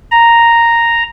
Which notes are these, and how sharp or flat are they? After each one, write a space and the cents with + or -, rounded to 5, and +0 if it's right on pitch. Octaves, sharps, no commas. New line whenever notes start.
A#5 -5